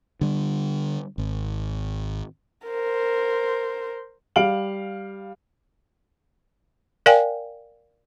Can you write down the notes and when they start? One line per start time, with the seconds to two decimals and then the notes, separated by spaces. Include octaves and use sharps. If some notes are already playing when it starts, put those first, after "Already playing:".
0.21 D3 G3
1.18 G#1
2.67 A#4 C5
4.36 G3 F5 D7 F#7
7.06 A#4 D5 F5 G5 G#5